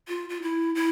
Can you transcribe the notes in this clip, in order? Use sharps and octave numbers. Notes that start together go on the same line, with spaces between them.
F4
F4
E4
E4